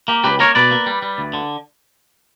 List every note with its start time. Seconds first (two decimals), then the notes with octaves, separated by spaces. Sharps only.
0.08 A#3 G4
0.24 C#2 G4 B4
0.39 A#3 A#4 C#5
0.55 B2 B4 D5
0.71 A#3
0.87 G3
1.02 G3
1.18 D2
1.34 D3